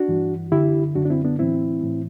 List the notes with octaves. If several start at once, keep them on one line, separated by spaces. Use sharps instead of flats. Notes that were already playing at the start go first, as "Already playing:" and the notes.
Already playing: D4 F#4
G2 E3
F#2 D3 E4 G4
F#2 D3 D4 F#4
D4
C4 E4
B3 D4
A2 E3 C4 E4
A2 E3